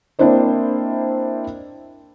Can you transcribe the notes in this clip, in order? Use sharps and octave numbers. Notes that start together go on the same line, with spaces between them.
A#3 C4 D4 E4 C5 D#5